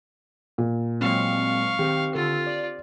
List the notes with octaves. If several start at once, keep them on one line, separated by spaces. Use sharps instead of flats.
A#2
F#3 G#3 C4 F5 C#6
D#3 C4 G4
D3 F4 A4
D5